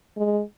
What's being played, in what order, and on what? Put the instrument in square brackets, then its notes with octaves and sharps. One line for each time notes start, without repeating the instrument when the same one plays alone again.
[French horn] G#3